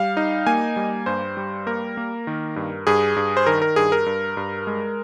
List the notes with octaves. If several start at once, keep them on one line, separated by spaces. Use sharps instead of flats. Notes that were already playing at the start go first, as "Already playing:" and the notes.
Already playing: G3 F5
D#4
A#3 G#5
G3
G2 C5
G3
A#3 A#4
A#3
D#3
G2
G2 G#4
G2
C5
D#3 A#4
A#4
G2 G#4
A#4
G2
G2
G#3